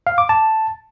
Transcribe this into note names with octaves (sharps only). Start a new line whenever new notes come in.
F5
D6
A5